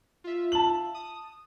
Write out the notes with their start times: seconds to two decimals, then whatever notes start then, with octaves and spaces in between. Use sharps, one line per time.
0.24 F4 E5
0.52 A5 F#7
0.94 D#6